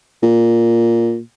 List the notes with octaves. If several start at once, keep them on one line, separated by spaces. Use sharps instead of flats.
A#2